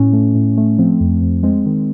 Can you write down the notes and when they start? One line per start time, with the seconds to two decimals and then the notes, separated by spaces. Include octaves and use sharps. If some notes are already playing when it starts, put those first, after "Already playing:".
Already playing: A2 C#4
0.13 A3
0.35 A2
0.57 A3
0.78 F3 C4
1.00 F2
1.22 F2
1.43 G#3 C4
1.66 D#3